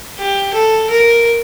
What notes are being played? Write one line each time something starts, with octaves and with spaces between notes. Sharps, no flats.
G4
A4
A#4